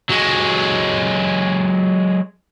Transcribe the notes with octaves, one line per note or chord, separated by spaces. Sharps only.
F#3 G#3